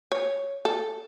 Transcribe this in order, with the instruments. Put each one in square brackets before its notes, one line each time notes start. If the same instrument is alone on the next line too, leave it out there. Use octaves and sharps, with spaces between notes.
[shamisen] C#5
A4